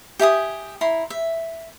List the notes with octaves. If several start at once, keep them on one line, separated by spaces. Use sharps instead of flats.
G4 E5 G#5 D#6
E4 A#5 C6
E5